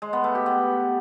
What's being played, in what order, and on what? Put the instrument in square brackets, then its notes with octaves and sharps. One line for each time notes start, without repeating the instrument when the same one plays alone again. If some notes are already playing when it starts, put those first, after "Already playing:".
[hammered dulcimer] G#3
B3
A3
G4
B3